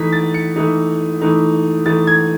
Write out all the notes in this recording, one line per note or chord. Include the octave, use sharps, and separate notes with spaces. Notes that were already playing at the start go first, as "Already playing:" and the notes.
Already playing: E3 A3 D#4 B6
A6
C#7
E3 A3 D#4
E3 A3 D#4
E3 A3 D#4 A6
G#6